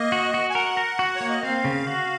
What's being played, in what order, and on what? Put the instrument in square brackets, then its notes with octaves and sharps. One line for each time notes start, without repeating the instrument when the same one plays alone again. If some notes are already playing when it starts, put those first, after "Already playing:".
Already playing: [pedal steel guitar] A#3 [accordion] D#5
[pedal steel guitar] F#4
F#4
[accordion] G#5
[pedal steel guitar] A#4 [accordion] F#5
[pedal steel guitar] A#4
F#4
[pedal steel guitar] A#3 [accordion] C#5
[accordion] D#5
[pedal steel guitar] C4 [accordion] F5
[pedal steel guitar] C#3
F#4